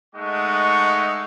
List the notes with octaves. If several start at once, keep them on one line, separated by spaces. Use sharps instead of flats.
G#3 A3 D#4 F#5 C#6